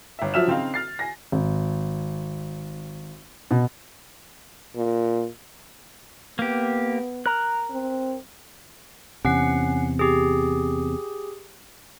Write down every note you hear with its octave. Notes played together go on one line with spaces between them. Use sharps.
G1 E5
F3 F#3 E5 E6 F6 E7
C#3 C4 D#4 F5
F6 A6 C7
G#5 A#6
G#1
B2
A#2
A#3 B3 G4
A#4 F#6
C4
E2 C3 C#4 F#5 C7
G4 G#4